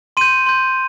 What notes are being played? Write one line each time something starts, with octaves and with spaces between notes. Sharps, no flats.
C6 G6 D#7
C6 G6